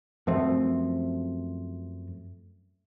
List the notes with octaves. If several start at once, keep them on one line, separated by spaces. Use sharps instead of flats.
F#2 F3 A3 C4